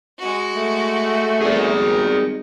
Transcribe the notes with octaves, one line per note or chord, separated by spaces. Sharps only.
G#3 F#4
A3
G#1 G3 D#4 G#4 D5